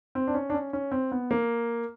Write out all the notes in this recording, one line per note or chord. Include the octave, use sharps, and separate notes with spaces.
C4
D4
C#4
D4
C#4
C#4
C4
B3
A#3